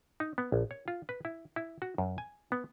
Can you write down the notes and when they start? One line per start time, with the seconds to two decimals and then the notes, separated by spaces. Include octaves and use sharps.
0.20 D#4
0.38 B3
0.52 A#1
0.71 C#5
0.88 F4
1.09 B4
1.25 E4
1.56 E4
1.82 F#4
1.98 F#2
2.18 G#5
2.52 B3